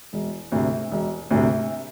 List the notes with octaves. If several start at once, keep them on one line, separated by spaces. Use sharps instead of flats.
E1
D2 C3
E1
D2 C3